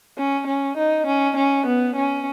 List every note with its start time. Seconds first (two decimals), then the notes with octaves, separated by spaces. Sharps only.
0.18 C#4
0.47 C#4
0.78 D#4
1.07 C#4
1.37 C#4
1.67 B3
1.96 C#4